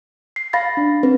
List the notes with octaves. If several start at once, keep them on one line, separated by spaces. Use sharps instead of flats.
C7
F5 B5 A6 A#6
D4
C4 B4